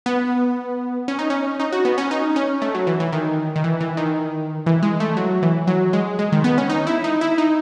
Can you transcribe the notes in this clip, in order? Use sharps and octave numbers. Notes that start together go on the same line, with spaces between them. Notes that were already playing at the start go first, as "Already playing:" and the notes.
B3
C#4
D#4
C#4
D#4
F#4
B3
C#4
D#4
C#4
A3
F#3
E3
E3
D#3
D#3
E3
E3
D#3
E3
G#3
A3
F#3
E3
F#3
G#3
G#3
D#3
B3
C#4
D#4
E4
D#4
E4
D#4